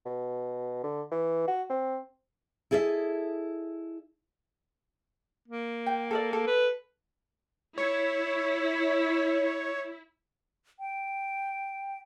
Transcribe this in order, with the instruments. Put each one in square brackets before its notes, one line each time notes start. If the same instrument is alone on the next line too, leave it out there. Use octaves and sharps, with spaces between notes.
[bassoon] B2
D3
E3
F#4
C4
[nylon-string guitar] E4 G#4 A4 D#5 E5
[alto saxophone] A#3
[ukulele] G5
A4 A#4 D5
A4
[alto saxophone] B4
[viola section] E4 [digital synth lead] C#5
[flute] G5